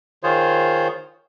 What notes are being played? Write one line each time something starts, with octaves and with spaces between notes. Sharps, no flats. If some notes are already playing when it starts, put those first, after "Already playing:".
D#3 F4 G#4 C5 C#5